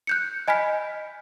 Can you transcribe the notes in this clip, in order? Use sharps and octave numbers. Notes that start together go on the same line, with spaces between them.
F#6 G6 C#7
D#5 G#5 B5 F6 B6